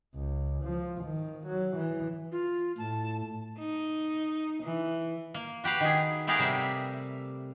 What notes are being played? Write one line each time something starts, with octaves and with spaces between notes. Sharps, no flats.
C#2
F3
D#3
F#3
E3
F4
A2 A5
D#4
E3
A#3
F#4 G4 B4 F5
D#3 G#4
A3 B3 G4 G#4 A#4 F5
C3 G3 E5